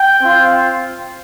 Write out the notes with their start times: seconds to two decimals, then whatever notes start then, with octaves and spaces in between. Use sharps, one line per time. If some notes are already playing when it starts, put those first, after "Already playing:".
Already playing: G5
0.20 C4 F4